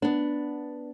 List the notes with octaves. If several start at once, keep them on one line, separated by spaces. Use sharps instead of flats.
B3 D4